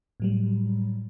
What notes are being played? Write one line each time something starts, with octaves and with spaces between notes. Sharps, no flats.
A2 F#3 G3